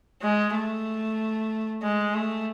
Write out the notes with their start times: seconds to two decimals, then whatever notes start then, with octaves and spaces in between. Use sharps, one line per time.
0.22 G#3
0.55 A3
1.83 G#3
2.15 A3